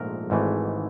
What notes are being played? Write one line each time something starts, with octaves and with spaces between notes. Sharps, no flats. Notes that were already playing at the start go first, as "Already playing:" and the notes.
Already playing: A#1 G#2 F3 A3 A#4
G#1 G#2 E3 A3